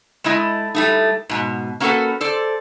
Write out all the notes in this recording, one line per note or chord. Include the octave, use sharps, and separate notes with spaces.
G#3 A3 E4 D#5
G3 A3 D#4
G#2 B2
A#3 C#4 F#4 G4 A4 B4
A4 C5 D5